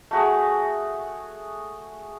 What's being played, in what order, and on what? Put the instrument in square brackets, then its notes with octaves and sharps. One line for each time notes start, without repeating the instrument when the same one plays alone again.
[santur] A3 F#4 G#4